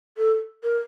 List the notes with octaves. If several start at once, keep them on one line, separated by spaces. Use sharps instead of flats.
A4
A#4